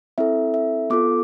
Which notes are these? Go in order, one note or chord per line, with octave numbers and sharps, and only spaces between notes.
C4 E4 A4 E5
E5
B3 F4 A4 D6